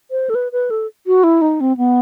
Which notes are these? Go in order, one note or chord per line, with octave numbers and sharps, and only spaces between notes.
C5
A4
B4
B4
A4
F#4
E4
D#4
C4
B3